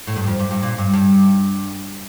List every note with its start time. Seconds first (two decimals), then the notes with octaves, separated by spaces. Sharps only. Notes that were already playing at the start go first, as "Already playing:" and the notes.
0.07 A2
0.16 G2
0.27 F2
0.39 G2
0.51 G2
0.62 A#2
0.78 G2
0.94 G2